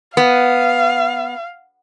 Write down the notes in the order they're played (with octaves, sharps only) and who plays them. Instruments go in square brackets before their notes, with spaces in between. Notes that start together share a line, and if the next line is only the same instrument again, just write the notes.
[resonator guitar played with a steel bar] B3 [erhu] F5